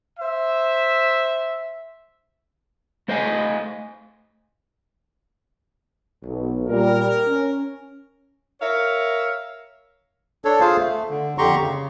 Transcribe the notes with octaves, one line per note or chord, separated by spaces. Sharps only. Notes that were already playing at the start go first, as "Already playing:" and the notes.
C5 E5
A3 C5 D#5 F5 G#5
B1
A#2 G3 A#4
C#4
A#4 C#5 E5 F5
D4 A4 C#5
F4 G#4 C5 F5
A3
D3
F2 D3 G4 A#5 C6 C#6
C#3